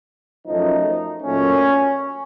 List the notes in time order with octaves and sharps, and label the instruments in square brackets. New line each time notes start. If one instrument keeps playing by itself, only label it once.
[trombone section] F#2 F3 A3 D#4
A#2 F#3 A3 C#4